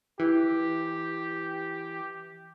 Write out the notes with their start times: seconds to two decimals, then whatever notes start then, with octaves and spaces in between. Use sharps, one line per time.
0.19 E3 G4